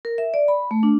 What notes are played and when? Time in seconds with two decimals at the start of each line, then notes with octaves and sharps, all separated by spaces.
0.05 A#4
0.18 E5
0.34 D5
0.48 B5
0.71 A3
0.83 D4